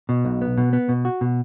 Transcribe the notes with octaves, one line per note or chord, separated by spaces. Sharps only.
B2
B1
B3
B2
B3
B2
F#4
B2